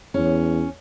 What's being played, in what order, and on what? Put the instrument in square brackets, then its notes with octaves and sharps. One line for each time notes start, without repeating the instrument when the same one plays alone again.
[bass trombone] E2 [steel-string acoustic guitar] C#4